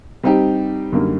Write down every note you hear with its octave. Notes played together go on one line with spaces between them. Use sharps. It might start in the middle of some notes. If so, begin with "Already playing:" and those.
G3 C4 D#4 G4
F#2 D3 G3 A#3 D#4